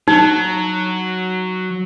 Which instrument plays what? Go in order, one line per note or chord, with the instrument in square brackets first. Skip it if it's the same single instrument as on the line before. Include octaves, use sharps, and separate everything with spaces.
[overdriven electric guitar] F#3 [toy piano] D#4